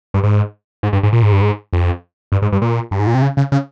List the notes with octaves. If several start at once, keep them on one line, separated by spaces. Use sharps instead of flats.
G2
G#2
G#2
G2
G#2
A#2
G#2
G2
G#2
F2
G2
G#2
G2
A#2
G2
G#2
A#2
C3
C#3
C#3
C#3